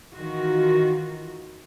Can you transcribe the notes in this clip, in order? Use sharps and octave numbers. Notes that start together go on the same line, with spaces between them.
D#3 E3 F4 F#4